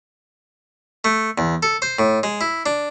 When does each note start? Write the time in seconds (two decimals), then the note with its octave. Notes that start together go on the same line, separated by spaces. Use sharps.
1.04 A3
1.38 E2
1.63 A4
1.82 C5
1.99 A2
2.23 G#3
2.41 E4
2.66 D4